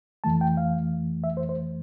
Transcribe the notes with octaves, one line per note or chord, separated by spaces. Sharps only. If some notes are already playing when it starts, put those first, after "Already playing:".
F2 E3 A3 A5
G5
F5
E5
C5
C5